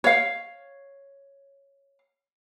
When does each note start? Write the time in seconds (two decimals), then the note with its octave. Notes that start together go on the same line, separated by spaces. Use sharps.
0.04 C#5 F5